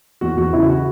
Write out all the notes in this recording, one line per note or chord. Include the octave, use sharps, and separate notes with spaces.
E2 F#4
E2 F#4
C#3 E4
F#4